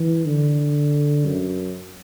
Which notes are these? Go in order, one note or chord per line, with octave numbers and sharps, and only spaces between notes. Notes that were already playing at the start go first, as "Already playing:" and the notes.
Already playing: E3
D3
F#2